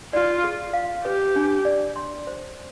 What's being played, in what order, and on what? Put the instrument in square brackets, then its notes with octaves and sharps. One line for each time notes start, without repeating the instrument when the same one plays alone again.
[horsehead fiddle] F4 [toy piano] D5
[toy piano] G#4
F5
[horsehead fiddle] G4 [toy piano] B4
[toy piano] D4
D5
C6
C5